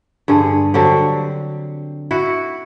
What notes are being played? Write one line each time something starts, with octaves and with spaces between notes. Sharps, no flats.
G2 D3 G#4
D3 F#3 C4 G4
E4 F#4